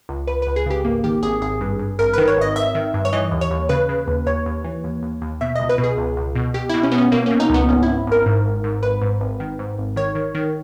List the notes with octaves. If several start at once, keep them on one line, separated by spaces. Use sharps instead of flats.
C#2
C#2 B4
C#2 B4
G#4
C#3 G4
G#1 A#3
D#3 G4
G#1 G#4
G#1 G#4
G2
G2
G#1 A#4
D#3 B4
C#5
G#1 D#5
G#1 E5
D#3
G2
C#5
E3 D#5
D#2
C#5
D#2
C#3 B4
C#3
D#2
D#2 C#5
D#2
E3
D#2
D#2
D#2
B2 E5
C#2 D#5
B4
B2
G#4
C#2
C#2
B2
B2 G4
B2 E4
C#4
B2 B3
C#4
B2 A#3
B2 C#4
D#4
C#2 B3
G#1 C#4
G#1 E4
G#1 A#4
G#2
G#1
G#2
G#1 B4
G#2
G#1
D#3
G#2
G#1
D#3 C#5
D#3
D#3